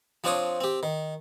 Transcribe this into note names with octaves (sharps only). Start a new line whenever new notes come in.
F3 C4 D4 C5 C#5 D#6
C4 G4
D#3